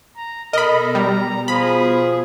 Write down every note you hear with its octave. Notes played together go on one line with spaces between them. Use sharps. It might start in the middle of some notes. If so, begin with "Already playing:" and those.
A#5
B2 A4 A#4 D#5 B5
G3 A#5
F3 G#4 B5